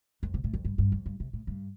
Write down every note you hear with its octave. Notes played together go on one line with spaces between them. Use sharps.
F2
C3
A2
F2
G2
G2
F2
G2
C3
A2
G2